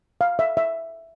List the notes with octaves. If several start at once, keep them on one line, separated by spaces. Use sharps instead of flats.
F5
E5
E5